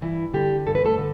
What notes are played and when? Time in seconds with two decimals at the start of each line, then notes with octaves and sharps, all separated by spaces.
0.01 G2 E3 E4
0.33 D3 G3 G4
0.67 G2 A4
0.75 B4
0.84 A3 A4
0.98 D3